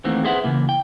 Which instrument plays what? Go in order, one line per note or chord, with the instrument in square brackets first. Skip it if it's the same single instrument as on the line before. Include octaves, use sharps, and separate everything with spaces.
[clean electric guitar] D#2 D#3 E3 A3 B3 C4
G#4 B4 C5 E5 F#5
C#3 E3 A#3
G5